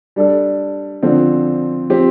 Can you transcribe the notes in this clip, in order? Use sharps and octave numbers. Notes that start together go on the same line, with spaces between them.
G3 D4 A4
D3 F3 C4
F3 C4 G4